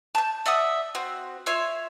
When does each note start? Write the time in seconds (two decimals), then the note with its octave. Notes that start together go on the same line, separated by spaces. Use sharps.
0.15 A5 G6
0.46 D5 E5 F#5 D#6
0.95 C4 F#4
1.46 F4 C#5 E5 C6